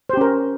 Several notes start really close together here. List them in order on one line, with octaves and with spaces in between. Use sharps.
C5 G4 C#4 A#4